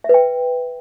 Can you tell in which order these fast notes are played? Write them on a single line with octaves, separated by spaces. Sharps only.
E5 B4 G5